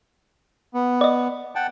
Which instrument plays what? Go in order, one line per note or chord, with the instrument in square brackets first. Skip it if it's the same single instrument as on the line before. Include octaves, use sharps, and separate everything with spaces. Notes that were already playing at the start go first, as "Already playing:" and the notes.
[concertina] B3
[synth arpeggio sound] D5 D#5
[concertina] F#5 G5 A5